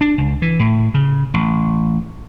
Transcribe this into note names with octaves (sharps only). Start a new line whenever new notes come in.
D4
C#2
E3
A2
C#3
A1